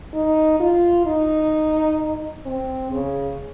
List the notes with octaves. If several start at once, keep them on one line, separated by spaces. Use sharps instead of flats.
D#4
F4
D#4
C4
C#3